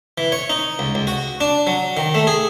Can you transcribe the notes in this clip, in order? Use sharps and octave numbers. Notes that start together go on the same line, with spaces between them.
E3
C#5
D#4
C#2
C#2
F#4
D4
F#3
D#3
A3
G#4